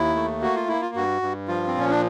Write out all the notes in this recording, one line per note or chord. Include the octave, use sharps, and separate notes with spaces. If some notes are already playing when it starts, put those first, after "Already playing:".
Already playing: D#2 E4
A3
A#3 F#4
F4
A#3 E4
F4
G2 F#4
G2
F3 F4
C4
A#2 C#4
D4